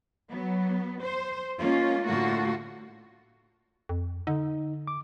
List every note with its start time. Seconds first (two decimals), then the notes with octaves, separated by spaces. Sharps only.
0.31 F#3 B3
1.03 C5
1.59 G#3 A#3 C#4 F4
2.06 A2 D3 A3 A#3 F4 F#4
3.89 F2
4.27 D3 D#4
4.87 D6